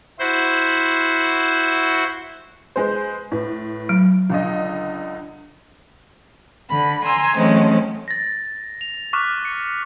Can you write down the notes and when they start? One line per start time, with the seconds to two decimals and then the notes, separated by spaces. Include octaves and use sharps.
0.19 E4 F#4 C5
2.76 G#3 B4 C5
3.32 A2 B4
3.89 F#3
4.30 C#2 D3 D#5
6.69 D3 B5
7.05 G#5 A#5 C6 E6
7.36 E3 F#3 G#3 A3 C4 C#4
8.08 A6 A#6
8.81 F7
9.13 C#6 D6 F6 F#6 B6
9.45 C#7